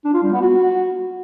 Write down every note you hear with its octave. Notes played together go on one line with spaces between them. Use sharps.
D4
F4
G3
B3
F#4